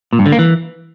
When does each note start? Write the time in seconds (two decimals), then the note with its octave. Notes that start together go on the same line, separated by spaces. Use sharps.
0.13 A#2
0.19 G2
0.26 D3
0.32 A#3
0.39 E3